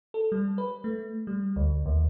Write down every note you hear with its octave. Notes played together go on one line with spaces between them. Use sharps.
A4
G3
B4
A3
G3
D2
D#2